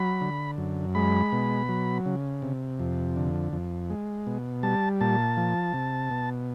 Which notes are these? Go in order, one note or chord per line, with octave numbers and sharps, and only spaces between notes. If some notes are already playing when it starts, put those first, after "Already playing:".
Already playing: F#3 B5
D3
F#2
G#3 B5
B2
F#3
C#3
C3
F2
D3
F2
G#3
B2
G3 A5
A#2 A5
F3
C3
B2